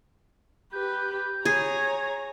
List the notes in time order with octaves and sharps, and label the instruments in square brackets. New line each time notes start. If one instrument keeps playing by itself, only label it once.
[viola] G4 B4 [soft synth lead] G6
[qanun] G#4 [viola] C#5 A#5 [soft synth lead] G#6